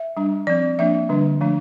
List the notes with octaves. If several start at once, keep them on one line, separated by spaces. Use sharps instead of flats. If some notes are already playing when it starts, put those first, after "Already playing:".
Already playing: E5
G3 D4
F3 C4 D5
F3 A#3 D4 E5
D3 G3 D4
F3 A3 D4